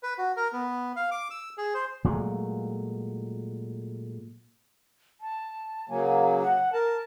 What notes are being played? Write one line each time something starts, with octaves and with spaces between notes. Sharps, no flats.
B4
F#4
A#4
B3
F5
D6
E6
G#4
C5
A#2 F#3 G#3 A3
A5
C#3 F#3 A#3 G#5
F#5
A#4 A5